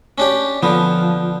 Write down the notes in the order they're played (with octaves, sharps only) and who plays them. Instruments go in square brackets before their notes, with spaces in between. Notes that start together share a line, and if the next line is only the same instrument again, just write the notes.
[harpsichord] C#4 D4 G4
[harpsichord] D3 B3 [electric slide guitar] F3